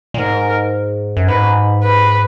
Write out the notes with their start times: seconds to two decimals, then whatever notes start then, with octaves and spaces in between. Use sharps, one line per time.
0.14 A#2
0.18 G#2 A#4
1.17 F#2
1.28 G#2 B4
1.83 B4